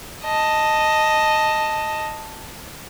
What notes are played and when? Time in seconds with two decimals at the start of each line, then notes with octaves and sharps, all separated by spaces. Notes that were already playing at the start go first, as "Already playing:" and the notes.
0.24 D#5 A5